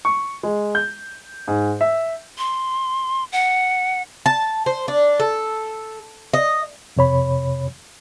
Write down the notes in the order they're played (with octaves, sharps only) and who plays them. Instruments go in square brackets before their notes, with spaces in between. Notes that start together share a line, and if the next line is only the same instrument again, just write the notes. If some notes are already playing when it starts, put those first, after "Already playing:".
[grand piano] C#6
G#3
G6
G#2
E5
[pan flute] C6
F#5
[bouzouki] A5
C5
D4
A4
D#5
[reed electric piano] F2 C3 C#5 B5